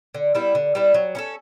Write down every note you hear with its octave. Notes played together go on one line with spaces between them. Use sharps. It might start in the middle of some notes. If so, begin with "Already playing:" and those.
D3
G3 B3 E4
D3
G3 B3 E4
F#3
C#4 E4 A4